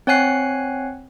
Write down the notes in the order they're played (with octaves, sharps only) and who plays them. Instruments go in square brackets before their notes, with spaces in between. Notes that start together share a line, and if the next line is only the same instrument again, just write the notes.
[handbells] C4 C#5 F#5 G#5 F#6 C7